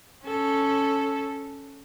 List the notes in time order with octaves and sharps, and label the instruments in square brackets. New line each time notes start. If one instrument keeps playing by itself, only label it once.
[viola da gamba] C#4 A4